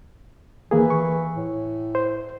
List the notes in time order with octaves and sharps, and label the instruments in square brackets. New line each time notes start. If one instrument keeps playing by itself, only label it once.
[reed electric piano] D#2 A#3 G#4 [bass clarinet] E3
[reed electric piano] C#6
[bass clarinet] A2
[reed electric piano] C5